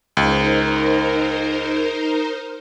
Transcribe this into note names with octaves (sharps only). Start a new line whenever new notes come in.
C#2 D#4 A#4 C5